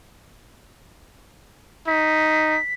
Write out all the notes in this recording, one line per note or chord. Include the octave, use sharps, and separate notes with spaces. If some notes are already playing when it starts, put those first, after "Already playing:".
D#4 B6